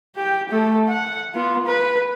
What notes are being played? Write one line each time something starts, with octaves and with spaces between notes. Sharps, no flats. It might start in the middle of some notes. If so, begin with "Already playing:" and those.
G4 G5
A3 A4
F#5
B3 F4
B4